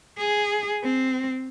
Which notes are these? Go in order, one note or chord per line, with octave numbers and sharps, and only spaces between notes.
G#4
C4